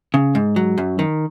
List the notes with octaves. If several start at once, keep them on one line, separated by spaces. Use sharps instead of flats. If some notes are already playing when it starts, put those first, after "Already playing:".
C#3
G#2
F#3
F#2
D#3